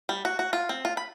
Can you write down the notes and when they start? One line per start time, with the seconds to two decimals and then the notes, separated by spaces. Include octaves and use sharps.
0.09 G3
0.25 F#4
0.39 F#4
0.53 F4
0.69 C4
0.85 F4
0.97 B5